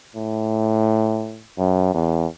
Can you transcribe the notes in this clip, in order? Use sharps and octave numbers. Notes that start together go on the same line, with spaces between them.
A2
F#2
E2